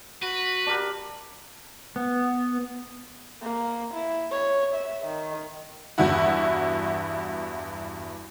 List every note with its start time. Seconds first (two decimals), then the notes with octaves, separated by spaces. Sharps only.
0.22 F#4 B4
0.66 D4 G4 A#4
1.96 B3
3.42 A#3
3.94 E4
4.31 C#5
4.74 E5
5.06 D#3
5.98 E2 G2 E4 F#4